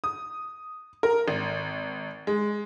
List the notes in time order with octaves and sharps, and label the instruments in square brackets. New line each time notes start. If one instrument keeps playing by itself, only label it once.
[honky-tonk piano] D#6
A#4
G#1
G#3